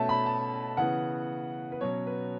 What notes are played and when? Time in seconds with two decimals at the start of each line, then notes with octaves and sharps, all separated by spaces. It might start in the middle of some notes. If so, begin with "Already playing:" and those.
Already playing: B2 A3 C#4 E5 A5
0.09 B5
0.26 A5
0.77 C#3 E3 B3 F#5
1.72 B4
1.81 B2 F#3 C#4 C#5
2.07 B4